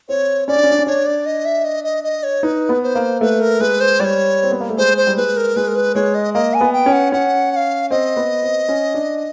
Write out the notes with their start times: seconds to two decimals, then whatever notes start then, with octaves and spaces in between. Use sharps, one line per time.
0.09 C4 C#5
0.48 C#4 D5
0.56 D4
0.63 C#4
0.71 D4
0.79 C#4
0.87 D4 C#5
1.06 D5
1.26 D#5
1.45 E5
1.65 D#5
1.84 D#5
2.04 D#5
2.23 C#5
2.43 D#4 B4
2.69 B3
2.83 C5
2.95 A#3
3.21 A3 B4
3.41 A#4
3.60 G#3 B4
3.80 C5
4.00 G3 D5
4.04 C#5
4.43 C4
4.52 B3
4.60 A#3
4.69 A3
4.77 G#3 C5
4.97 C5
5.07 G3
5.17 G#3 B4
5.37 A#4
5.56 G#3 B4
5.68 A#4
5.75 B4
5.95 G#3 C#5
6.15 D#5
6.34 A#3 D#5
6.54 G#5
6.61 B3
6.73 G5
6.86 C#4
6.92 F#5
7.12 C#4 F#5
7.51 F#5
7.56 F5
7.91 C4 D#5
8.17 B3
8.42 C4
8.69 C#4
8.94 D4